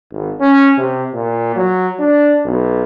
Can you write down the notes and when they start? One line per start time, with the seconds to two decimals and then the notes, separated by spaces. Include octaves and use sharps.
0.11 G#1
0.40 C#4
0.78 C3
1.13 A#2
1.56 F#3
1.99 D4
2.45 B1